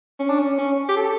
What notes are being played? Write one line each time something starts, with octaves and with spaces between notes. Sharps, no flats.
C#4
D4
C#4
C#4
G4
A4